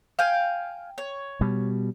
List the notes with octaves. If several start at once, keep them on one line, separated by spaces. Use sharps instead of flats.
F5 G5 G#5
C#5
B2 G3